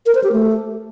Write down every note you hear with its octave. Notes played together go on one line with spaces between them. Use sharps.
A#4
C5
G4
A3